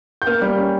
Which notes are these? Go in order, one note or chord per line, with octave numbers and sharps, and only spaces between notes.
G6
A#3 F6
G3
C#4